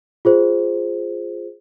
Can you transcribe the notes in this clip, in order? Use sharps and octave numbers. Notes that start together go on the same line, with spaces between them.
F4 G#4 C5